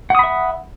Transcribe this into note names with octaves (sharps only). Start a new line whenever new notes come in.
E5 F#5 B5 D#6